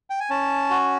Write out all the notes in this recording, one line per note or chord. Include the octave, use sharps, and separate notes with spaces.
G5
G#5
C#4 A5
F#4